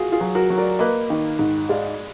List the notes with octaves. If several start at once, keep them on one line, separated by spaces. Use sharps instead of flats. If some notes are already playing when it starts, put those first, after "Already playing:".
Already playing: F4 F#4 G#4
F4 G#4
F#3
F#4 A#4
F#3
A#4 D5
A#3 B4 D#5
D#3
G#2
G#3 D5 F5